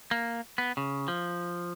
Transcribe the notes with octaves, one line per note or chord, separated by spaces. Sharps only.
A#3
B3
C#3
F3